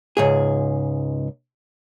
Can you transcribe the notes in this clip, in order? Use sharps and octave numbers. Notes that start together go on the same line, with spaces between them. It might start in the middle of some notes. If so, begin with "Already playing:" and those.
C#2 G#2 G#4